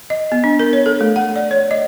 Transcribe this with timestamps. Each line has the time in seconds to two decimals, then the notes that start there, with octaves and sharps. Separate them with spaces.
0.10 D#5
0.32 B3
0.44 D4
0.59 A#4
0.73 C#5
0.86 A4
1.01 A3
1.16 F#5
1.36 D5
1.51 C#5
1.71 D#5